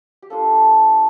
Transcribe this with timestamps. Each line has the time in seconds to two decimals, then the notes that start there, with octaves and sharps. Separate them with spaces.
0.22 G4
0.30 A#3 D4 F4 A4